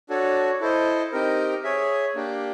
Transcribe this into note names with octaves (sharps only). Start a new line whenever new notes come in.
D4 F#4 A4 C#5
E4 A4 C5 D#5
C4 D#4 G4 A#4
G#4 C#5 E5
A#3 D4 G4